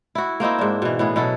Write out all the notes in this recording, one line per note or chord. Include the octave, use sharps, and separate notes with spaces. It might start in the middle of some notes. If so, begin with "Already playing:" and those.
E4 F#4
A#3 C4 D#4 E4
G#2 D4
B2 E3
A2 B3 G#4
B2 F#3 E4 A4